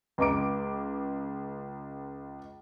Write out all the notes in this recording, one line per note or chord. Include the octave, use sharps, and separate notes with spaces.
C#2 A#5 D6 D7